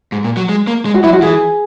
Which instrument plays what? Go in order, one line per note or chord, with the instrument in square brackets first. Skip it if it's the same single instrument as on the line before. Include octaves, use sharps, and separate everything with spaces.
[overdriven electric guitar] G#2
A#2
F#3
G#3
A#3
G#3
[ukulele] F#4
[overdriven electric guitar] F#3 [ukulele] E4
[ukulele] F#4
[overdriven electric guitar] E3 [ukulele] G#4